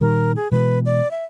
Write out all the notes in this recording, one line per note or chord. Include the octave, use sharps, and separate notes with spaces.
A#2 D#3 G3 A#4
G#4
B2 E3 G#3 B4
D5
E5